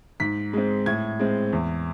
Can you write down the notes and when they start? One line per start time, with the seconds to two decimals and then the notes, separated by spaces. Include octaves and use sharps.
0.20 G#2 B6
0.53 G#3 C4
0.86 A2 G#6
1.19 G#3 C4
1.52 E2